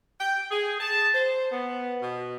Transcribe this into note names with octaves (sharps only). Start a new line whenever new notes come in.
G5
G#4
A5
C5
B3
B2